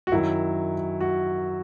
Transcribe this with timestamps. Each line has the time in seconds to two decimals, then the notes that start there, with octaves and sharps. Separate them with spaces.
0.07 F#4
0.12 F#2 D#3 F#3 E4
1.01 F#4